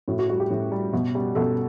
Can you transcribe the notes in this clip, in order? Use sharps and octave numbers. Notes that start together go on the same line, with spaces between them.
A2 F#4
F#4
G3 F#4
G4
A2
G3
B2
G3
B2 A4